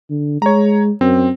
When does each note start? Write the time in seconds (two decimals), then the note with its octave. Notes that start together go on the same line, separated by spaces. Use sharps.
0.10 D3
0.42 G#3 C#5 A#5
1.01 F#2 C4